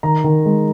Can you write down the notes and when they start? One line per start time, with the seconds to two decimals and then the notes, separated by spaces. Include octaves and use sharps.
0.03 D#3 A#5
0.24 D#3
0.46 G#3